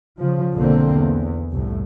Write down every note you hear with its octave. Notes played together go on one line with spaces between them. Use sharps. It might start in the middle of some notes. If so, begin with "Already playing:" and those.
C#3 F3
B1 F2 D3 A#3 C4
E2
F1 C2 A2